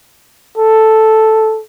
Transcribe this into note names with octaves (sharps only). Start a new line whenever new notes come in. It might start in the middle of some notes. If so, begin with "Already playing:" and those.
A4